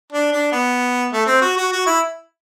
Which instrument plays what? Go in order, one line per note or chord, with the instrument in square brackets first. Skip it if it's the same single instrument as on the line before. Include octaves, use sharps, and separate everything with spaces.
[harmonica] D4
D4
B3
A3
C4
F#4
F#4
F#4
E4